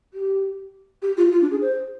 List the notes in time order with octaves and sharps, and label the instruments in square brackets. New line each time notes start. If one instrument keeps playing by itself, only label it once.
[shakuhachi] G4
G4
F4
F4
D4
G#4
C5